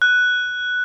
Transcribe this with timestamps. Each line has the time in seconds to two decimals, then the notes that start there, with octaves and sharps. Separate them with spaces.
0.02 F#6